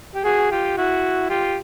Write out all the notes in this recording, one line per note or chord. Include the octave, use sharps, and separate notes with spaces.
G4
F#4 G#4
F4 G4
E4 F#4
F4 G4